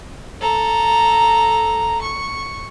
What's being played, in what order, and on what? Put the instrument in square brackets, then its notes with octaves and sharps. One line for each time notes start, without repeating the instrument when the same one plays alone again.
[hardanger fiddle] A4 A#5
C#6